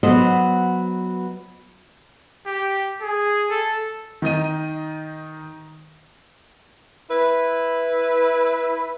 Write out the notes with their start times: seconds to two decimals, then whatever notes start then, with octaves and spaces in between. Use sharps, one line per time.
0.03 F#3 B3 F#4 B4 C5 D#5
2.46 G4
3.02 G#4
3.50 A4
4.22 D#3 D#4 D#5 D#7
7.09 E4 B4